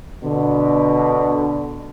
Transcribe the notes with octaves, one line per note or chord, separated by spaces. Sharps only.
B2 D3